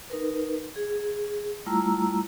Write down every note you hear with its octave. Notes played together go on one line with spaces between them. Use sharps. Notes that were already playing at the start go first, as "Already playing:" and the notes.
D#4 A#4 B4
G#4
G3 A3 E4 F4 A#5 E6